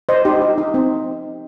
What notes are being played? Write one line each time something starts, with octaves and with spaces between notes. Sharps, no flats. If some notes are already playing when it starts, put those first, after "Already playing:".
C5 D#5
D#4 G4
D#4
D#4
C4